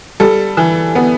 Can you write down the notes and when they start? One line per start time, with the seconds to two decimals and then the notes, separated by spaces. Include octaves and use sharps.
0.20 G3 A4
0.57 E3
0.95 B3